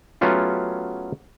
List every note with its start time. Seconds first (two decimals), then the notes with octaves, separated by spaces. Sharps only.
0.21 F#3 A3 B3 C#4 F4 G4